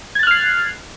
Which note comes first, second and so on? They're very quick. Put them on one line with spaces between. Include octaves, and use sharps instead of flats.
G#6 A6 F#6 F6 C7